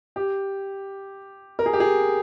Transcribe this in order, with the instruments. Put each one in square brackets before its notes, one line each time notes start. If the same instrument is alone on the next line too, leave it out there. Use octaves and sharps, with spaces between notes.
[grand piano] G4
A#4
G#4
G4
G#4